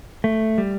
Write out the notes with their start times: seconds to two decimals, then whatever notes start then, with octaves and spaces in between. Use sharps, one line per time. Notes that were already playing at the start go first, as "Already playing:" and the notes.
0.24 A3
0.58 G3